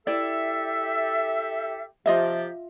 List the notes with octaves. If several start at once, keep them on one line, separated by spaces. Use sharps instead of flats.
E4 G4 A4 D5 E5
C3 F3 F4 G4 D#5 E5